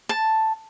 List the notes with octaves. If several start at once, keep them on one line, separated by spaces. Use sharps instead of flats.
A5